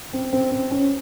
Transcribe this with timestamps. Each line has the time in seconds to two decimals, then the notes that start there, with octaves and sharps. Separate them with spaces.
0.13 C4
0.33 C4
0.51 C4
0.71 C#4